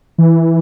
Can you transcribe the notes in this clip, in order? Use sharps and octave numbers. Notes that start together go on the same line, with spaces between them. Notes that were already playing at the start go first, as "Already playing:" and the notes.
E3